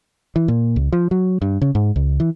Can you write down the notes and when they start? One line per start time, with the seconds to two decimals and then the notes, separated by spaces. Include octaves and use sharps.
0.36 E3
0.48 A#2
0.76 C#2
0.92 F3
1.11 F#3
1.42 G2
1.62 C#3
1.75 G#2
1.96 C#2
2.20 E3